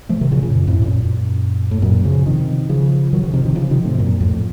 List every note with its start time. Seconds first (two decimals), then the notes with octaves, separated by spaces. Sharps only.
0.09 F3 A3
0.21 C3 D#3
0.31 A#2 C#3
0.43 A#2 C#3
0.52 F#2
0.67 F2 A2
0.82 F#2 A#2
1.71 A2
1.82 F#2 A#2
2.04 C#3 F3
2.26 C3 D#3
2.69 C#3 F3
3.13 D#3 F#3
3.24 C#3 F3
3.33 C3 D#3
3.45 C3 D#3
3.55 C#3 F3
3.70 C3 D#3
3.84 A2 C3
3.98 F#2 A#2
4.21 F2 A2